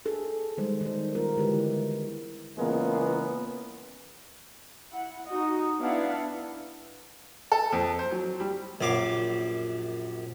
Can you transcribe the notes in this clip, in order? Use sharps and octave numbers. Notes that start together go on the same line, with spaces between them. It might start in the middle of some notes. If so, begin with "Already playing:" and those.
D4 G#4 A4
D#3 G3 G#3 C5
D#3 C5
G3 B3 F4 A#4
D3 G#3 E4 G4 B4
E3 E4
A#2 C#3 E3 G#3 A#3 B3
E4 F#5
D#4 F#4 D#5
B3 D4 E4 F5 F#5
A4
F2
C5
F#3
G3
A#1 F#2 F5 D6